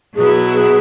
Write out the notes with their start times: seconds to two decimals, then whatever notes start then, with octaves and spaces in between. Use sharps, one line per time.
0.15 B2 F#3 B3 E4 G#4
0.53 G#4